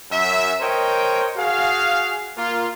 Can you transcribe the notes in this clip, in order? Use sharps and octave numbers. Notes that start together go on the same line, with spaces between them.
F#2 E5
A#4 C5 C#5 D#5 G5
F#4 G#4 F5
A#3 F4